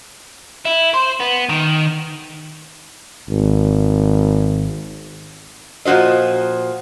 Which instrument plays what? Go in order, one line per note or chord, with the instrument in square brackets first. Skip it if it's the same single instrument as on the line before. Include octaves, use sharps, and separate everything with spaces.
[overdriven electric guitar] E4
C5
B3
D#3
[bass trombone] G#1
[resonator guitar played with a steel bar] A#2 F3 F#4 C5 D#5